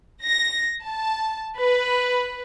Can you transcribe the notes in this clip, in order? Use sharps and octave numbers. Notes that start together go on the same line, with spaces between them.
A#6
A5
B4